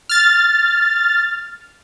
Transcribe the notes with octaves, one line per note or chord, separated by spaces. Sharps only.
F6 A6